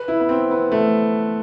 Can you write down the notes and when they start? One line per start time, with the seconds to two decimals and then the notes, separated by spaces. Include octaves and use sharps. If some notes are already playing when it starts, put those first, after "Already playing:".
Already playing: B4
0.08 E4
0.20 B3
0.29 C4
0.51 B3
0.72 A3